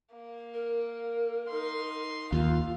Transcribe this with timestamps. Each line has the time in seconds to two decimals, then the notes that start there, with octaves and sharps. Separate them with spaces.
0.13 A#3
0.54 A#4
1.48 D#4 C6
2.32 D#2 F4 F5